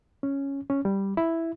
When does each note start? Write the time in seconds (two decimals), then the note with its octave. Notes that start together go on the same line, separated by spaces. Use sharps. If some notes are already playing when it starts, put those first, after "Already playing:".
0.23 C#4
0.70 C#4
0.85 G3
1.17 E4